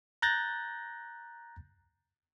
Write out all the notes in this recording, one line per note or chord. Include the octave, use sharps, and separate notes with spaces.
A#5 F#6 G6 A6 A#6